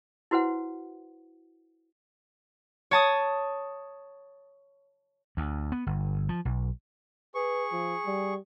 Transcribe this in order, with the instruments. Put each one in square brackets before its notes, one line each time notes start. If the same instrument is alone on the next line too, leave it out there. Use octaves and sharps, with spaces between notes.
[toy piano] E4 F#4 B4 C5 F#5
[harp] C#5 A5 D#6
[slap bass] D2
B3
G1
F3
B1
[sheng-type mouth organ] G#4 C#6 [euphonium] B4
[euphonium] F3
G3